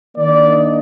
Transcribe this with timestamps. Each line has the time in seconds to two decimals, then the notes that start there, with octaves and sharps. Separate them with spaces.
0.15 D#3 A#3 D4 D5
0.48 D#5